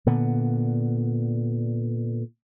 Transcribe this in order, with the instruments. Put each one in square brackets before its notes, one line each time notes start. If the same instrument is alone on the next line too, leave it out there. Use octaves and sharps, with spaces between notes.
[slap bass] A#2 D3 B3